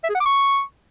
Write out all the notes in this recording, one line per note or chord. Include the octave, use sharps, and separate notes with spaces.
E5
G#4
F#5
D6
C#6